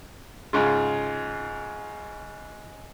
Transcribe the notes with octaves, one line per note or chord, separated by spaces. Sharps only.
G#2 C#3 F4